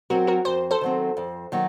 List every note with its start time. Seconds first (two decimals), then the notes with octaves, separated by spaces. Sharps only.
0.10 F#3 C4 F#4 A#4
0.27 F#4 A#4
0.45 F2 C5
0.71 A4 C5
0.81 D#3 F#3 C4
1.17 F2
1.52 D#3 F#3 A#3